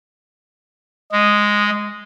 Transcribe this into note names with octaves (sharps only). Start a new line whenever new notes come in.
G#3 D#5